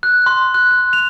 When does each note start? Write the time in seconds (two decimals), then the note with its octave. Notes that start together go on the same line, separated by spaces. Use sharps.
0.03 F#6
0.26 C6
0.54 F#6
0.71 F#6
0.93 F7